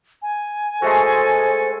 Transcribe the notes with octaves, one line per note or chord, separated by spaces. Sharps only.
G#5
G#3 A3 F#4 A4 C5